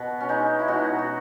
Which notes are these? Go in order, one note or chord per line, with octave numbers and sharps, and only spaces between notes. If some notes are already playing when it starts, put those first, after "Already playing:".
Already playing: B2
C#4
G#3 D#4
E4
B2 D#4 F#4
F#4